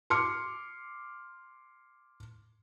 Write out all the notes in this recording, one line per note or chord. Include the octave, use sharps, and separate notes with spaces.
C6 D6 F6 C#7